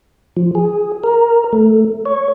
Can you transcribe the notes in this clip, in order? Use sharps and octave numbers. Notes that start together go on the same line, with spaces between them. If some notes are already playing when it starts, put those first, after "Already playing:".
F3
G#4
A#4
A3
C#5